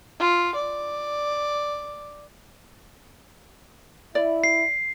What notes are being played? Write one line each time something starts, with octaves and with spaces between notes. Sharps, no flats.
F4
D5
E4 D5
C7